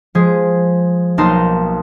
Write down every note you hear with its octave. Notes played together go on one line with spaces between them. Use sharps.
F3 G#3 G#4
B1 A#3 D#4 A#4 A5 C6